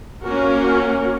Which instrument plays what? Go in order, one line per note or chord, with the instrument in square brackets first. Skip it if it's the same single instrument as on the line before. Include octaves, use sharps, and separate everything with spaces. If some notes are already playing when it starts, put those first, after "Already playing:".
[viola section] A#3 C#4 F#4 A#4